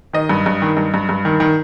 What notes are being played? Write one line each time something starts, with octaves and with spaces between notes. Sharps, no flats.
D#3 D#5
G2
G2
D#3
G2
G2
G2
D#3
D#3